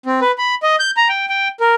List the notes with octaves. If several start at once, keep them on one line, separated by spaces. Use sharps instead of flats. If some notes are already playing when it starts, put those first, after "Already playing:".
C4
B4
B5
D#5
G6
A#5
G5
G5
A#4